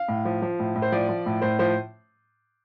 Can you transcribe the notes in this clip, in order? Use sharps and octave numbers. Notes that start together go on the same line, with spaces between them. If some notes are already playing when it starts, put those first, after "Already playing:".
Already playing: F5
A2
F3
F3
A2
A2
C5
F3 D5
F3
A2
A2 C5
F3 C5